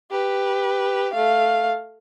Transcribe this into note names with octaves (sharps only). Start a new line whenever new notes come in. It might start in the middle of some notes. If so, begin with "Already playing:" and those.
G4 B4
A3 F5